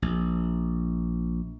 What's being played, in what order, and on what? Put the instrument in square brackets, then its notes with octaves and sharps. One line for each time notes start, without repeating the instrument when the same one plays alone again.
[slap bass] A#1